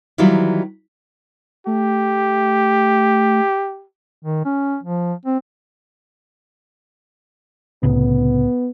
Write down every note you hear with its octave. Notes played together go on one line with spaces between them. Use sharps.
D#3 E3 F#3 G3 E4 F4
A3 G4
D#3
C#4
F3
C4
C2 A2 C#3 B3